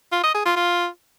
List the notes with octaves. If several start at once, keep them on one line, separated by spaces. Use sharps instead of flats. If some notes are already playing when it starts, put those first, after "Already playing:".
F4
D#5
G#4
F4
F4